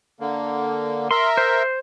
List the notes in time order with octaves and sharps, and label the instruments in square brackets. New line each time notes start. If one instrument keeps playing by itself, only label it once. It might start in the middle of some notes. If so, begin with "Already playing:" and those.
[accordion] D3 A#3
[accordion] A#4 E5 [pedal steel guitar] C6
[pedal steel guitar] C5